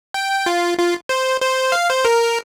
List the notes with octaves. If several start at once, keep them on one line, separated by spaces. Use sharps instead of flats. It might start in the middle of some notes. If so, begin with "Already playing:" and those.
G5
F4
F4
C5
C5
F5
C5
A#4